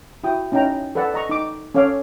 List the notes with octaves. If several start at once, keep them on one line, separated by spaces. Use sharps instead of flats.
E4 F#4 G5 D#6
C#4 D#4 E4 G5 A#5
A4 B4 D5 F#5 A5
D#5 A#5 C#6
D#4 D6
C#4 A4 C#5 F5 D6